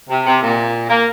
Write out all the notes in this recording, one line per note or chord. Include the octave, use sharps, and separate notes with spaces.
C3
C3
A#2
A#3